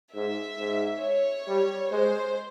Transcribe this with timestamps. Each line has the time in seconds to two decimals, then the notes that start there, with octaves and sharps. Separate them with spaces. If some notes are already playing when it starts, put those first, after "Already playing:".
0.14 G#2 E5
0.59 G#2
1.03 C#5
1.47 G3
1.92 G#3 C5